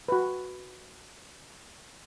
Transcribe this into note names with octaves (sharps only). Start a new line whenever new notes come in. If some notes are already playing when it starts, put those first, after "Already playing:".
F#4 B4